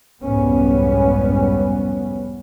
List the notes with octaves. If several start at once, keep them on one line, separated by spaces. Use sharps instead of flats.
C2 F2 G#2 G3 B3 C#4